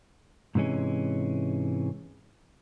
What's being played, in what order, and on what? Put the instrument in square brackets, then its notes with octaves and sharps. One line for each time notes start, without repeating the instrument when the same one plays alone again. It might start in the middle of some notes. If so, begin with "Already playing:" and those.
[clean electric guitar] G#2 C3 E3 G#3 C#4